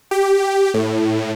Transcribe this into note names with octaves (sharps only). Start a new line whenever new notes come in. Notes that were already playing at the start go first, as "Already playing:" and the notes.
G4
A2